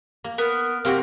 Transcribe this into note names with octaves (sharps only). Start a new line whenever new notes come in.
A#3
B3 A#4
C3 A#3 C4 F#4